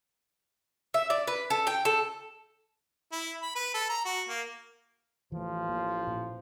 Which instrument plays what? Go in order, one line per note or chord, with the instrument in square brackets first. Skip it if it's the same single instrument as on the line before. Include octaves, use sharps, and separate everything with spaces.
[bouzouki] E5
D5
B4
A4
G5
A4
[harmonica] E4
B5
B4
A4
A#5
F#4
A#3
[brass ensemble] A1 F3 [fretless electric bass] E3 A3
[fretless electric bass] A#3
A#2